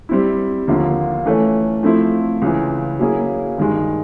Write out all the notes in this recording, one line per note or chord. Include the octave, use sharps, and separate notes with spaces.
G3 C4 E4
D#2 D3 F3 A#3
E3 A3 C#4
F3 A3 C4 E4
C#2 C#3 E3
F#3 A#3 C#4 E4 G#4
G2 D#3 G#3